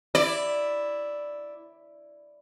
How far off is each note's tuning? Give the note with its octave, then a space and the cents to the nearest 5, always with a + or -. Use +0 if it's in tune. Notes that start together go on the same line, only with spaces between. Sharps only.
E4 +0 D5 +0